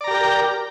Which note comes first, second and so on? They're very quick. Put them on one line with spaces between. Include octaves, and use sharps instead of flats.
D5 A#5 G4 A#4 G5